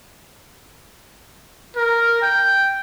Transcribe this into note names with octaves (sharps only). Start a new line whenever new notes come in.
A#4
G5